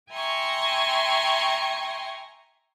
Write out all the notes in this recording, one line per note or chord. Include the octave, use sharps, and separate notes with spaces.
E5 G5 G#5 A#5 C6 C#6